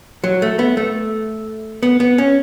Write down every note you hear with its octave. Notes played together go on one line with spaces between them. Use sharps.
F#3
A3
B3
A3
B3
B3
C#4